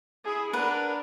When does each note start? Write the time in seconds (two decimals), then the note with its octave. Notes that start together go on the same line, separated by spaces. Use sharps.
0.25 E4 G#4
0.53 D4 A#4 B4 F#5